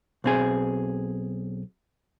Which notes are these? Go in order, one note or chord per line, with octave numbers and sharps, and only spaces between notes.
B1 C4 G#4